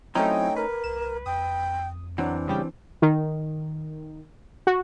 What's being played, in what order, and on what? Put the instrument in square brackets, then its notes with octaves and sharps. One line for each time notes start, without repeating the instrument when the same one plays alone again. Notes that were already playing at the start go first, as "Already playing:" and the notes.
[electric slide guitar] F#3 C4 E4 [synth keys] A3 C#4 D#4 [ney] G5
[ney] A#4 [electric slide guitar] B4
[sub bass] C2 [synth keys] E7
[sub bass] F2 [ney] G5 [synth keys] D#6
[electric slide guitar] E3 C4 [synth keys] F#3 [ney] D4
[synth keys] C#3 G3 G4
[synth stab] D#3
F#4